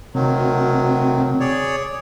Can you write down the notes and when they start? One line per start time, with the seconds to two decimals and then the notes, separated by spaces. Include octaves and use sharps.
0.15 D2 C3 D#3 F#3
1.40 G#4 C#5 D5